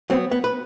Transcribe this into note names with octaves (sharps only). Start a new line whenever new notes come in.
F#3 B3 C4
B3
B4